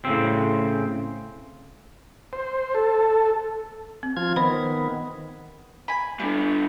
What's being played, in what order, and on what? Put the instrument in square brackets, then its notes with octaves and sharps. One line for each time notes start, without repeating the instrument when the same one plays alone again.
[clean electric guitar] A2 C#3 C4
[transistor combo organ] C5
A4
[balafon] C4
[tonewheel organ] F3 F4 G#6
[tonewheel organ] D#3 B3 [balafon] C5 B5
[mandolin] G#5 B5
[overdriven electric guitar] G2 D3 [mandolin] E4